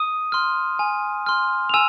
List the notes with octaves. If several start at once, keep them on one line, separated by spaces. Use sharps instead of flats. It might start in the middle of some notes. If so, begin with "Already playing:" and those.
Already playing: D#6 D#7
C6 F6
G#5
C6 F6
F7
G#5 E6 E7